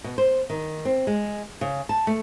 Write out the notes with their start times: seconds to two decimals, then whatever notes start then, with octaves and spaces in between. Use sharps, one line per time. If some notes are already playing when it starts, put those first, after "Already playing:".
0.04 B2
0.18 C5
0.50 D#3
0.85 C4
1.07 G#3
1.61 C#3
1.89 A5
2.07 A3